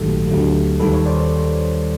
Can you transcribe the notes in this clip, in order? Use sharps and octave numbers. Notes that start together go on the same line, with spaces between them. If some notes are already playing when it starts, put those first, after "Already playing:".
Already playing: A#1 G#2 D#3 F#3 A3 G4 A4
D2 D3 F#3 A3
D#2 D#3 G3 A4 B4
B4 C#5
C5 D5